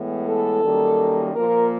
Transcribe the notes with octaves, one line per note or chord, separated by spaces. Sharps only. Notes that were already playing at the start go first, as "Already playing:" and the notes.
Already playing: A2 E3 G#3 B3
A4
F#2 D#3 G3 A#3
A#2 F3 A#3 A#4